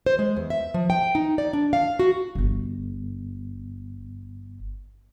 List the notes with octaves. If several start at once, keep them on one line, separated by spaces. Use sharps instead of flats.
C5
G#3
E2
E5
F3
G5
D#4
D5
D4
F5
F#4
D1 G1